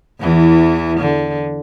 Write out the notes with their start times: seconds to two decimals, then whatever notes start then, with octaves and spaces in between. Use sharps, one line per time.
0.21 E2 E3
1.00 D3